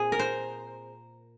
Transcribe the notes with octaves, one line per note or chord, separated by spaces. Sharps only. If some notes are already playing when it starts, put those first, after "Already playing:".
Already playing: A#2 C4 G#4
A#4
C5